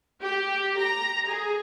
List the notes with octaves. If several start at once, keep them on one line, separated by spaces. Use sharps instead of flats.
G4
A#5
G#4